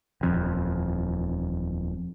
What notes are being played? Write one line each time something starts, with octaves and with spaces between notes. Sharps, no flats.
D#1 F2